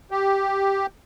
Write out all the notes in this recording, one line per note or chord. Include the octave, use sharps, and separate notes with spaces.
G4